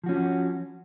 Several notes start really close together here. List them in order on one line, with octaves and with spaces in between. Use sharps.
F3 F#4 C#4